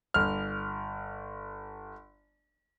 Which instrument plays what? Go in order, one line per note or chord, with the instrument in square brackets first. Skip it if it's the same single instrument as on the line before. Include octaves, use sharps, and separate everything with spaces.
[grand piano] G1 F6